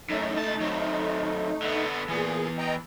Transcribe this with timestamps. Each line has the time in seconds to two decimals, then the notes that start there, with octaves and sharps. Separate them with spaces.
0.10 F#2 A2 A3 D#4
0.37 C#2 A5
0.60 F#3 C4
1.62 D3 B3
2.08 A#2 E3 B3 G#4
2.58 D#5 G5 A#5